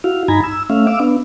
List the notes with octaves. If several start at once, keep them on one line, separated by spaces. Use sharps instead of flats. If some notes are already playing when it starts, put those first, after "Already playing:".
E4 F#4 F5
G2 D#4 G#5 A#5 B5 G#6
E6
A3 C#4 E5 F5
F5 D6 E6
B3 D4